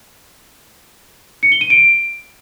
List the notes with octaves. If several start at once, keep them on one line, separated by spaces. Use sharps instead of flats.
C#7
G7
D#7
D7